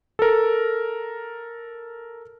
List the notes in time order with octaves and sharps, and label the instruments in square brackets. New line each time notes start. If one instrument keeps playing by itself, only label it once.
[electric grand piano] A4 A#4